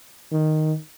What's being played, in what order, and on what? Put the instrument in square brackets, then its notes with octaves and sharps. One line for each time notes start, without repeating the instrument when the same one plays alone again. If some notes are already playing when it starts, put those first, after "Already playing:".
[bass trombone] D#3